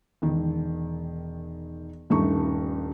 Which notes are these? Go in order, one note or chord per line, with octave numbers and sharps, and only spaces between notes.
E1 D#3
D#1 G2 A3 C#4 D#4 C#6